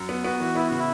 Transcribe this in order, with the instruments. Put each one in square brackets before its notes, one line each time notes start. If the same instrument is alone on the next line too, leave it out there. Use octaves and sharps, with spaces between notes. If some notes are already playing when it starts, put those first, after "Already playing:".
Already playing: [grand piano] F#2
B3
[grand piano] B3 [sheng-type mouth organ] F#4
[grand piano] E3 [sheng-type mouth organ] F#4
[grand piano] B3 [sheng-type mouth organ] E4
[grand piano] C#3 [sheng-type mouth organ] F#4
[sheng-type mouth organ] E4